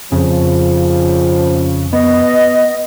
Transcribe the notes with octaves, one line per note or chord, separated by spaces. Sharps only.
F2 C#3 F3
B3 D#5